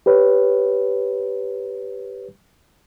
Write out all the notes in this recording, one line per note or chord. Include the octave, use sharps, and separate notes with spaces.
G4 B4 C#5